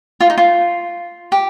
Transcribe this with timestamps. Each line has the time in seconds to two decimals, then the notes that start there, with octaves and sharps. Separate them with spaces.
0.20 F4
0.30 D#4
0.38 F4
1.32 G4